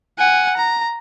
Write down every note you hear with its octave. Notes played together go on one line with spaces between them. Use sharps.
F#5 G#5
A#5